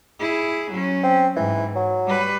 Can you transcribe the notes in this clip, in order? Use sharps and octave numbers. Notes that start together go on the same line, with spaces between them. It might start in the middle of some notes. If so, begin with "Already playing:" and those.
E4 G#4
F#3 C#4
C4
G#2 E3
F#3
G3 B4